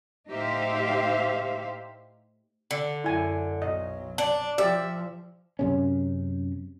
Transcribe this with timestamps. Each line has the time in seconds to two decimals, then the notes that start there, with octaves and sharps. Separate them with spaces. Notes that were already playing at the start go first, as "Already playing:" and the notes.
0.29 A2 D#4 G4 C5 E5 F5
2.71 D3
3.04 F#2 E4 G#5
3.62 B1 F#3 D#5
4.18 D4
4.58 F3 G4 D5 E5
5.59 F#2 C3 C#4